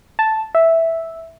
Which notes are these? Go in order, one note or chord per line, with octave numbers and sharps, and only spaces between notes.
A5
E5